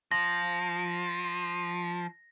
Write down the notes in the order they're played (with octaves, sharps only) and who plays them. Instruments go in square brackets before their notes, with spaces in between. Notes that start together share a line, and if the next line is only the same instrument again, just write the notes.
[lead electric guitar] F3 [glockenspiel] A#6